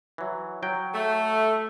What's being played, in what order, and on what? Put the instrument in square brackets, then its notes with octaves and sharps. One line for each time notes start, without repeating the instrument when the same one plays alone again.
[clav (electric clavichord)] E3 F#3
F#3 G5
[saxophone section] A3